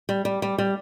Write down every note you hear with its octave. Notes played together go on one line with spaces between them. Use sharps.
G3
G3
G3
G3